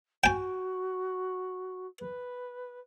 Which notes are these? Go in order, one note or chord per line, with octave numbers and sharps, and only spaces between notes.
F#4 G5 G#5
B4